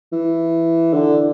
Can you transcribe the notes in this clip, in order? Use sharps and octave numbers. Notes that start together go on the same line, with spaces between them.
E3
D3